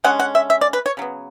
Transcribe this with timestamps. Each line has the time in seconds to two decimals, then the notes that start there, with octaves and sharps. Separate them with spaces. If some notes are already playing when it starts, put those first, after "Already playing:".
0.04 D3 G#3 C#4 F#5
0.20 F#5
0.35 E5
0.50 E5
0.61 D5
0.73 B4
0.86 C#5
0.97 C#3 F#3 B3